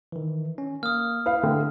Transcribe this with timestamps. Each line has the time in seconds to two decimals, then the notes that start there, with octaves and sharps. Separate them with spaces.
0.12 D#3 E3
0.58 C#4
0.83 A#3 D#6 F6
1.26 E4 B4 F5
1.43 D3 A3 G5